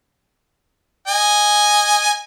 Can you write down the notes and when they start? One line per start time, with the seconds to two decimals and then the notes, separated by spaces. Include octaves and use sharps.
1.08 D#5 G#5